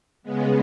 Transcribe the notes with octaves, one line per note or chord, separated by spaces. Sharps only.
C#3 G#3 B3